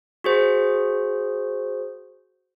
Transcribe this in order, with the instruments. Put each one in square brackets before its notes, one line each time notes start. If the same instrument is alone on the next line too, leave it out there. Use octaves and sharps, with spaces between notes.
[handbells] F#4 G#4 C5